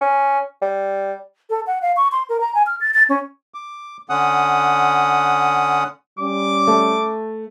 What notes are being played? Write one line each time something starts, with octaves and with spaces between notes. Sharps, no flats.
C#4
G3
A4
F#5
F5
C#6
C6
A#4
A#5
G#5
F6
A6
A6
C#4
D6
D3 C#4 F#5 D#6
G3 C#4 D6
A3